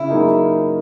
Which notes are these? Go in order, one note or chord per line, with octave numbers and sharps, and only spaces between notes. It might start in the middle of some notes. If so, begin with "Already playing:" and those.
Already playing: C#3 E4
F#3 A#3 D#4 G#4